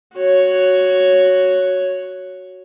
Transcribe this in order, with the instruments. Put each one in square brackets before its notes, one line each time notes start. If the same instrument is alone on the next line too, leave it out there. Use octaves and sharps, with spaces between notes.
[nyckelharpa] F#4 C#5